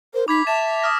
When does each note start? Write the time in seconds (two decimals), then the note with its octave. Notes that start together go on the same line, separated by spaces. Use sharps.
0.14 A#4 C5
0.28 D#4 B5 D6 G#6 B6
0.47 E5 A5 A6 E7 F7
0.82 D#6 F6 A#6